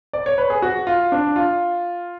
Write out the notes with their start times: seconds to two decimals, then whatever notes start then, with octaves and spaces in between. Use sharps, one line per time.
0.13 D5
0.26 C#5
0.38 B4
0.50 G#4
0.62 F#4
0.87 F4
1.12 D4
1.36 F4